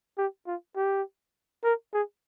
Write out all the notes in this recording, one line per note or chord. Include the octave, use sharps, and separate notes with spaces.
G4
F4
G4
A#4
G#4